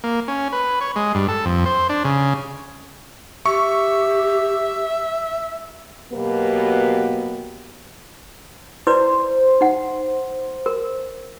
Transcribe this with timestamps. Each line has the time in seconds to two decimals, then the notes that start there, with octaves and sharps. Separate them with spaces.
0.04 A#3
0.28 C#4
0.52 B4
0.81 C#5
0.96 G#3
1.15 G2
1.28 A4
1.46 F2
1.66 C5
1.89 D4
2.05 C#3
3.46 G4 E5 C#6
6.13 B2 F#3 A#3 B3 G4 B4
8.87 E4 B4 C5 D5
9.61 D#4 F#5
10.66 A#4